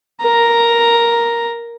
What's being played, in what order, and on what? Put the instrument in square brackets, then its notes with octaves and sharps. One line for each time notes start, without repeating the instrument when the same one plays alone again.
[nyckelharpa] A#4 A#5